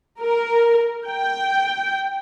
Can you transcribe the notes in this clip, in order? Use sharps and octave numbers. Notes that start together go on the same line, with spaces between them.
A#4
G5